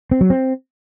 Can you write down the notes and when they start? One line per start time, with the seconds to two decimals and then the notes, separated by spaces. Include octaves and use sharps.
0.11 C4
0.21 F#3
0.30 C4